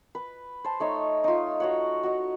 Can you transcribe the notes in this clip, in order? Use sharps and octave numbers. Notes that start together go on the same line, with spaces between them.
B4
C5 A5
A3 D#4 C#5
D#4 F4
F#4 C#5 F#5
F#4 D#5